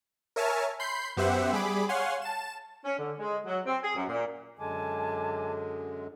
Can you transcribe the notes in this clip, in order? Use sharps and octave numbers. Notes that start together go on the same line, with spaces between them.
A#4 C#5 E5 G#5 A5 F6
B5 C6 G6 C7
F#2 B3 G4 C5 E5 F#5
G3 G#4 B5 D6
C#5 F5 F#5 G#5 C6
A5 E7
C#4
D3
G#3
F#3
C4
G#4
F#2
A#2
F#2 D3 G#3 G#5 A5 D6